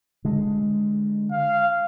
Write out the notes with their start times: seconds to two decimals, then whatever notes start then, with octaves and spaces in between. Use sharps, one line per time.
0.25 D3 G#3
1.32 F5